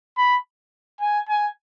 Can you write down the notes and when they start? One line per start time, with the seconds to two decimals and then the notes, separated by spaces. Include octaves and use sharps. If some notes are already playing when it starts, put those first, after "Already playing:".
0.17 B5
1.01 G#5
1.29 G#5